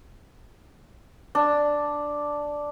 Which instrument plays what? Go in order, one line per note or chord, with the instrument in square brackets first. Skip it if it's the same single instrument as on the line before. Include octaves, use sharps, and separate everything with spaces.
[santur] D4